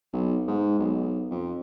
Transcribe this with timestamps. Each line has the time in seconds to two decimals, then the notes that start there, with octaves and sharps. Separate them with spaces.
0.13 B1
0.47 G#2
0.78 B1
1.31 F2